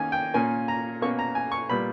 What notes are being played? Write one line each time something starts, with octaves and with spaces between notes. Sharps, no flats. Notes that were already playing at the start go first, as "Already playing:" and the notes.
Already playing: D#3 A#3 C#4 G#5
G5
A#2 A#3 C#4 G#5
A#5
B2 A#3 C#4 C#6
A#5
G#5
C#6
A#2 G3 B3 B5